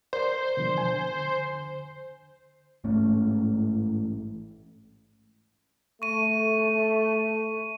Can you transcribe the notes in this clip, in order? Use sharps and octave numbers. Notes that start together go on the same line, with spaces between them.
A#4 C5 D5
B2 D3 F3
D3 G#5
A1 G#2 A3 C#4
A3 C#6 D#7